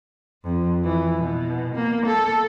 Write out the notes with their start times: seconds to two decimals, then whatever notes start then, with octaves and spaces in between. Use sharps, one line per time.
0.44 F2
0.84 E3
1.18 B2
1.75 A#3
2.06 A4